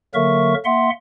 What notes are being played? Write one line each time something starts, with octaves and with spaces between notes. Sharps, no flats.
D3 F#3 A#3 A#4 E5 C#6
A#3 E5 F#5 C6